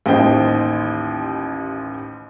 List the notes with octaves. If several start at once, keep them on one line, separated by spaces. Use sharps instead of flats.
A1 D#2 C5 D#5 G5